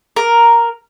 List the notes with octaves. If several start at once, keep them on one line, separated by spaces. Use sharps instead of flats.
A#4